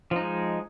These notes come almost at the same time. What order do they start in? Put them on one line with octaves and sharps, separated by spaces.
F3 D#4 G#3